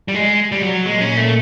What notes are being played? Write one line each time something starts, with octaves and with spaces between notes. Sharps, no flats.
G3
G#3
G3
F#3
A#2 G#3
C#4
A3